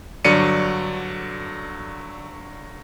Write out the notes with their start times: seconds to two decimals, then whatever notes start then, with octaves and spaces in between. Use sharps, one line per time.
0.25 G2 D3 F#3 D5 C#7 D#7